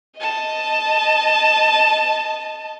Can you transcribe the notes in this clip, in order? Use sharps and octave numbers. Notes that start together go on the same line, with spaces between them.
D#5 A5